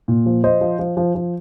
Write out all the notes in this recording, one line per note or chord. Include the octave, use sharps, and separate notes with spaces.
A#2
F3
F3 C5 D#5
F3
F3
F3
F3